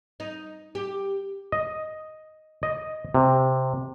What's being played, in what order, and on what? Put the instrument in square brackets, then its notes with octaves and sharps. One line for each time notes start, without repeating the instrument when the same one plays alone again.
[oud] D#4
G4
[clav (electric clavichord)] D#5
D#5
C3